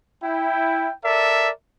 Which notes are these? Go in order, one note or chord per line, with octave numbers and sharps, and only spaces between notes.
E4 G5
A4 A#4 D5 E5